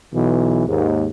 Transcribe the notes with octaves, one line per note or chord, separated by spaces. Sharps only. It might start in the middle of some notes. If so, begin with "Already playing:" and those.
B1 B2 E3
D#2 G#2